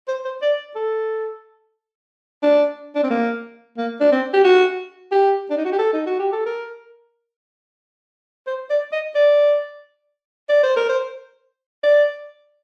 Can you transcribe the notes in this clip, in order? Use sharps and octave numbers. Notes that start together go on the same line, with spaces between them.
C5
C5
D5
A4
D4
D4
C4
A#3
A#3
D4
C4
G4
F#4
G4
D4
D#4
F#4
G4
A4
D#4
F#4
G4
A4
A#4
C5
D5
D#5
D5
D5
C5
A#4
C5
D5